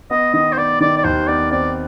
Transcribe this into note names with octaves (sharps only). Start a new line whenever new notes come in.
B3 D#5
D#3 D#5
C5
B3 D5
D#3 D5
D5
D#2 C5
B3 D5
C4 D5